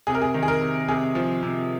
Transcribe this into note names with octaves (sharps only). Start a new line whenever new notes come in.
C3 G#4
A#4
G#4
D#3
G#4
A#4
C3
C3 G#4
F3
C3